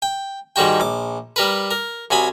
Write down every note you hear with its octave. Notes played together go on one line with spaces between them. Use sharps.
G5
G#2 D#3 G3 F#4 G5
A#1 D6
G3 A#4 B4
A#4
C2 F#3 G#5 B5 D#6